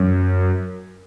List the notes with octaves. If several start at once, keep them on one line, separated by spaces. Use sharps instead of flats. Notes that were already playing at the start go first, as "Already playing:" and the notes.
Already playing: F#2